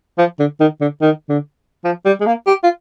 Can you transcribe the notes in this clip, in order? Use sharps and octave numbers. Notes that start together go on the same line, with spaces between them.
F3
D3
D#3
D3
D#3
D3
F3
G3
G#3
A#3
G4
F4